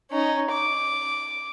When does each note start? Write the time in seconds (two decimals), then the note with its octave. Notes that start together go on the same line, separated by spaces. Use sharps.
0.11 C#4 D#4
0.51 D6